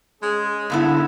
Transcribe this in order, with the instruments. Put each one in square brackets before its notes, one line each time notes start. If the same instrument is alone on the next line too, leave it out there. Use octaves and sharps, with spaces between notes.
[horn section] G#3 C#4 G#4
[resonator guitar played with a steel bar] G2 D3 E4 [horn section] B3